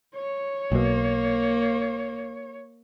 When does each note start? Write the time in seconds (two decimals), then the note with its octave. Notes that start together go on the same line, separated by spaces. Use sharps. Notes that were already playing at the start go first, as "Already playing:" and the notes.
0.15 C#5
0.72 B1 B2 A#3